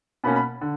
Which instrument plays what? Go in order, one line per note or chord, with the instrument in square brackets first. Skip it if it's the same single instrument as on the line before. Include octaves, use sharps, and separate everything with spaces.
[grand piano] B2 A#3 C#4 B5
B5
D3